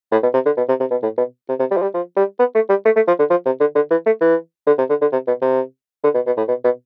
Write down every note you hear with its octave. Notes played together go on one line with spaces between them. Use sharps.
A2
B2
C3
D3
B2
C3
C3
B2
A2
B2
C3
C3
G3
F3
G3
F3
G3
B3
A3
G3
A3
A3
F3
D3
F3
C3
D3
D3
E3
A3
E3
D3
C3
D3
D3
C3
B2
C3
D3
B2
B2
A2
B2
B2